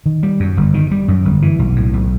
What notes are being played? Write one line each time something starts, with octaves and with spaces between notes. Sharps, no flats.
D#3
G3
F#2
G1
D#3
G3
F#2
G1
E3
B1
A2
B1